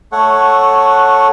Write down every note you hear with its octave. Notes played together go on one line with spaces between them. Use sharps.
A3 A4 C#5 F#5